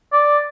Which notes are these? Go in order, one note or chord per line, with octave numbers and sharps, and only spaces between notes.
D5